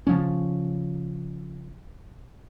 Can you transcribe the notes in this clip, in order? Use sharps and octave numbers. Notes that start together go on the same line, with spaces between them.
C#3 F3 C#4